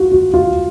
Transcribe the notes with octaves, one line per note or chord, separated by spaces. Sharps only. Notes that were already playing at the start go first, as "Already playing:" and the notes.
Already playing: F4 F#4
F#4
F4